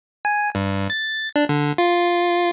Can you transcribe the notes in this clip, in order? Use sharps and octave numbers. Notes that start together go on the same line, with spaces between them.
G#5
G2
A6
D4
D3
F4